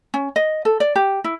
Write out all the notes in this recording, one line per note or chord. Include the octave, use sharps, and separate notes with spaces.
C#4
D#5
A4
D5
G4
E4